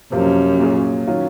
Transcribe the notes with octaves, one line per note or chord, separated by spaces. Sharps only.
F#2 C3 F3 A#3
A#2 F#3 C#4 G#4
D#3 F#3 C#4 F4